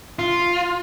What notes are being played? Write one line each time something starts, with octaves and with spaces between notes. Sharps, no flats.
F4